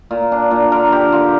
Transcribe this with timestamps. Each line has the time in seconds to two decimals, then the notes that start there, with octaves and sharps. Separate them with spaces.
0.11 A#2
0.32 D4
0.51 A#2
0.72 D3 A#4
0.92 D3 G4
1.12 D3 F4